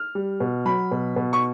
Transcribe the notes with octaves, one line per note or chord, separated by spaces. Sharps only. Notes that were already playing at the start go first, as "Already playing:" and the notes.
Already playing: F6
G3
B2
F#3 B5
B2
B2
C#6